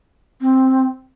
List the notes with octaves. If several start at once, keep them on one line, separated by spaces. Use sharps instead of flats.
C4